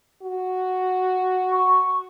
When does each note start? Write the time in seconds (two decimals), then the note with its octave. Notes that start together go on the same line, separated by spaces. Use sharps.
0.22 F#4
1.51 C#6